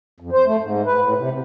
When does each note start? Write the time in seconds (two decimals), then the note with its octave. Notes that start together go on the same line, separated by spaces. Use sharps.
0.20 F2
0.32 C5
0.47 A3
0.61 G#2
0.86 B4
1.01 A2
1.18 C3
1.31 C3